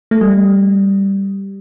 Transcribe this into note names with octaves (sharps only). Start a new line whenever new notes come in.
A3
G3